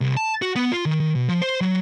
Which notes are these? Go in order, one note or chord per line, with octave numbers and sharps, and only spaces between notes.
C2
A5
F#4
B3
F4
D#3
D#3
B2
F3
C5
F#3